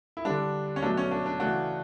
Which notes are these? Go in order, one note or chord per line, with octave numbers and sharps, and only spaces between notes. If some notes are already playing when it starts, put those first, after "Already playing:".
E4
D3 G3 D4
C#4
B2 F#3 A3 D4
C#4
D4
D4
C#3 E3 A3 D4 F#4